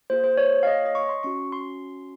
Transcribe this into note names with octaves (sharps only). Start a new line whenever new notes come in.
A#3 F4 G#4 C5
C5
C#5
F5
D#5
C#5
D#5
C#6
C6
C#4 F#4 C#6
C6